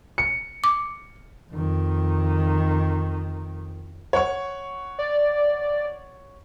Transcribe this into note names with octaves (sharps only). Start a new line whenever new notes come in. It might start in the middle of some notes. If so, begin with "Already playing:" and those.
C#7
D6
F2 D#3
C#5 F#5 C#6
D5